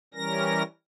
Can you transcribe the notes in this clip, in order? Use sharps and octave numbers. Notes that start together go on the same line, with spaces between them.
E3 G3 C#4 A#4 A#6